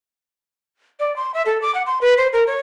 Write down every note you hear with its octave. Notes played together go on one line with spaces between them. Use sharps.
D5
C6
E5
A4
D6
F#5
C6
B4
C5
A#4
C#5